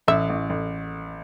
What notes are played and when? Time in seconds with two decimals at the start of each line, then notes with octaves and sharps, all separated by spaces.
0.08 A1 E5
0.29 A1
0.50 A1